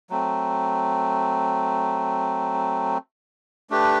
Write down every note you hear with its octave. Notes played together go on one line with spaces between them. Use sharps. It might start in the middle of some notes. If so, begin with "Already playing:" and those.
F#3 A3 C4
A3 D4 G4 B4